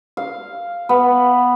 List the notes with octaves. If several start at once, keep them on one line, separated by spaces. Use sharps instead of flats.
F5
B3